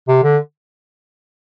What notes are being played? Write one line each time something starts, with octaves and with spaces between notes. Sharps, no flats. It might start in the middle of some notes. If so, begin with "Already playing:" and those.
C3
D3